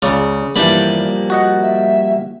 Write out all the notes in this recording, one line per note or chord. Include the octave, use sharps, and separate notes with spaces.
C#2 C#3 D5
G2 E3 F3 G3 A#3 D4 B5
F#4 D#5 F#5
E5